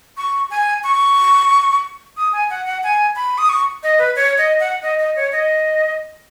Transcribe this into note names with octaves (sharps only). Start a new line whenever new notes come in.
C#6
G#5
C#6
D#6
G#5
F#5
F#5
G#5
B5
D#6
C#6
D#5
B4
C#5
D#5
F#5
D#5
D#5
C#5
D#5